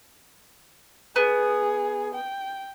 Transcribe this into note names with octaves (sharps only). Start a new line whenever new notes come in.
B3 G#4
G5